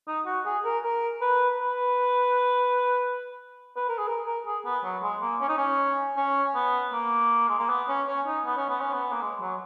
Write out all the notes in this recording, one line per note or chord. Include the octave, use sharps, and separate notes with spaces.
D#4
F#4
G#4
A#4
A#4
B4
B4
B4
A#4
G#4
A#4
A#4
G#4
B3
F#3
G#3
A#3
C#4
D#4
C#4
C#4
B3
A#3
G#3
A#3
B3
C#4
C#4
D#4
B3
C#4
B3
C#4
B3
A#3
G#3
F#3